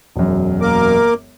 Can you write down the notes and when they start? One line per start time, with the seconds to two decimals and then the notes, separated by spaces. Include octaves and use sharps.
0.16 E1 F#2
0.61 A#3 A#4 D6